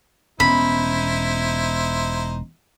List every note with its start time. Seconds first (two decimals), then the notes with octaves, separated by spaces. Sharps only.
0.40 E1 B3 C#4 D#4 E4 C5 B5